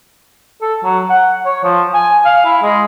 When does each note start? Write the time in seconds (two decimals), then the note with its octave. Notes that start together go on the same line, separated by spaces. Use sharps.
0.62 A4
0.84 F#3
1.10 F#5
1.46 C#5
1.64 F3
1.94 G#5
2.25 F5
2.45 E4
2.62 G#3